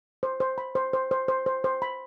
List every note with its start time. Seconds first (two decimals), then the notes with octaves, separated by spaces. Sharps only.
0.23 C5
0.40 C5
0.58 B5
0.75 C5
0.93 C5
1.11 C5
1.28 C5
1.46 C5
1.64 C5
1.82 B5